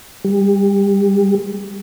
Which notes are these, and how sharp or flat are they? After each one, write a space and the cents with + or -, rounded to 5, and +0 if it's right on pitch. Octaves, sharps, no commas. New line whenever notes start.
G3 +25